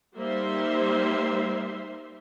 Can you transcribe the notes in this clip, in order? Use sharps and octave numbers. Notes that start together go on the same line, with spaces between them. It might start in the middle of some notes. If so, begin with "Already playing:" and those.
G3 A#3 D#4 C5 E5 C6